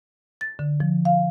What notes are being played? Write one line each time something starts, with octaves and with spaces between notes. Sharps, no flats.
A6
D3
F3
F5